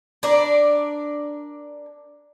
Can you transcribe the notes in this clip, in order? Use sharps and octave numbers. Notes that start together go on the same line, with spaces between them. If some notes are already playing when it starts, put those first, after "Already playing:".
D4 A#4 D5